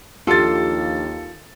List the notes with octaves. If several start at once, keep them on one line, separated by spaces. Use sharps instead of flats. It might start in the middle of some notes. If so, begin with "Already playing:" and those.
D#2 F3 D4 F4 G4 A4 A6